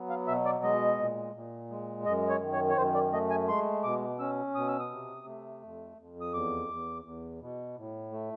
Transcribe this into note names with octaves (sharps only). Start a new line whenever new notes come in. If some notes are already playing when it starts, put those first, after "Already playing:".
Already playing: F#3 B3
F5
B2 E5
D5
G#3 D#5
A#2
A#2
G#3
F#2 D#5
C#5
D#3
C#5
C#5
F#2 C5
D5
A3 D#5
G#5
G#3 C6
B2 D6
C#4 E6
B2 D#6
E6
D#6
C3
A3
F2
F2
D#6
E2 D6
E2
E2
B2
A2
A3